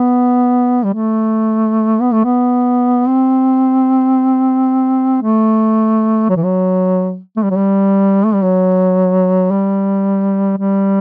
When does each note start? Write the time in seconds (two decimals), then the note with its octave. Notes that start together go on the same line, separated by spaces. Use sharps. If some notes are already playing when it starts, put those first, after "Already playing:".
Already playing: B3
0.85 G3
0.94 A3
2.01 B3
2.12 A3
2.25 B3
3.08 C4
5.22 A3
6.29 F#3
6.36 E3
6.43 F#3
7.36 A3
7.43 G3
7.50 F#3
7.57 G3
8.25 A3
8.34 G3
8.44 F#3
9.51 G3
10.58 G3